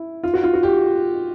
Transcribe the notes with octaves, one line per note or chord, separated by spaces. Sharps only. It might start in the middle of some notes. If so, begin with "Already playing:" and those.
Already playing: E4
F4
F#4
F4
F#4
G4